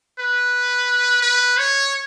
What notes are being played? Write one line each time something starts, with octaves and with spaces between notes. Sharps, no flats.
B4
B4
C#5